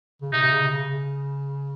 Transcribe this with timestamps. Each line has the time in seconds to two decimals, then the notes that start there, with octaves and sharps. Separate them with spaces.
0.22 C#3
0.32 C3 D#4
0.43 C3
0.51 C#3
0.64 C3
0.70 C#3
0.89 C#3